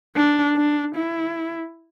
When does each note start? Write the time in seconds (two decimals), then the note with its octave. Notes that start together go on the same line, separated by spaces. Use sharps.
0.16 D4
0.56 D4
0.95 E4